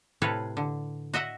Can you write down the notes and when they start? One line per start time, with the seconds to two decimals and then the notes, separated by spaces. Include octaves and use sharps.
0.22 A2 C3 A4 B4 C#5 F5
0.57 D3
1.14 F#4 D#5 E5 F#5